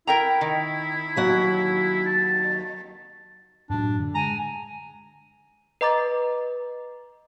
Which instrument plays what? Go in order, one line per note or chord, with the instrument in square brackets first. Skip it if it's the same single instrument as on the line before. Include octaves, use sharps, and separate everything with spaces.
[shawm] E4 [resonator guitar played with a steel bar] A#4 G5 A#5
[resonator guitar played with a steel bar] D#3
[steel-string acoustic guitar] D#2 F#3 F#5
[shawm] A5
[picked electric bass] F#2 A2 F#3 [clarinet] D4
[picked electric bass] D3
[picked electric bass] G#3 [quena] G#5 [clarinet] A#5
[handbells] B4 D#5 A#5 D6 A6